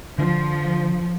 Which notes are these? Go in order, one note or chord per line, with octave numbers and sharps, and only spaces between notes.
D3 F3 D4